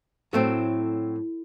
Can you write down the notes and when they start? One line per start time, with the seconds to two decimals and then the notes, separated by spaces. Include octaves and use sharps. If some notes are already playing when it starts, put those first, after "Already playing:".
0.33 A2 F#3 A3 C4